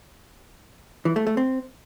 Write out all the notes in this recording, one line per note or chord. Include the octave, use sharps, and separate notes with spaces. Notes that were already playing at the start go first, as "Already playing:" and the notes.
E3
A3
A3
C4